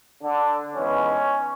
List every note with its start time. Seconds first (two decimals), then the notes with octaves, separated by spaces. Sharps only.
0.22 D3 D4
0.75 G#2 E3 G#3 B3 C#4